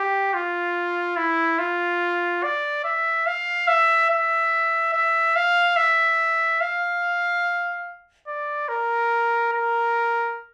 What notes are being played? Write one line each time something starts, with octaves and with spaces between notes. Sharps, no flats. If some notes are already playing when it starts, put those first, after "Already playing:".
Already playing: G4
F4
E4
F4
D5
E5
F5
E5
E5
E5
F5
E5
F5
D5
A#4
A#4